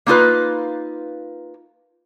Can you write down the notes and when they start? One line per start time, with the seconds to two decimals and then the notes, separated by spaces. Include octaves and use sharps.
0.07 A#3 D#4 F4 B4